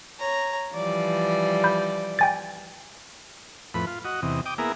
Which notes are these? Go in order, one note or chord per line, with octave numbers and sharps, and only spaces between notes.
C#5 A#5
E3 F3 G3 D5
B5 G6
G5 G#5 A6
F2 A2 B4 B5
F4
F#4 D#5
E2 C3 D#5
G5 D6 D#6
A#3 B3 E4 G#4 A#5